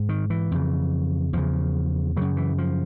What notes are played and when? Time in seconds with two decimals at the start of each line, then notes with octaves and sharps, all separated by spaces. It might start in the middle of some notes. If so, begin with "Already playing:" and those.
Already playing: G#2
0.09 D#3
0.30 E3
0.51 F2 C#3
1.33 E2 C#3 F3
2.17 F#2 C#3 F#3
2.37 E3
2.58 F3